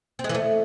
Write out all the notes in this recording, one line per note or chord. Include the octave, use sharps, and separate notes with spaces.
C4
G#3
E3
A3